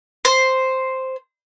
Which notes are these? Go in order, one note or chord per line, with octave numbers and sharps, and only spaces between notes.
C5